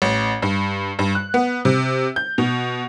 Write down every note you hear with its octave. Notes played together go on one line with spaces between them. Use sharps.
A1
G2
G2
F#6
B3
C3
G6
B2